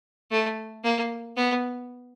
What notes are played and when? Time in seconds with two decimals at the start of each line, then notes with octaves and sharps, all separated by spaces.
0.31 A3
0.84 A#3
1.36 B3